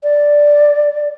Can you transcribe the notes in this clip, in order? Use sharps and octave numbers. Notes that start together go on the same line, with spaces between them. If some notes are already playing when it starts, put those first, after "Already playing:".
D5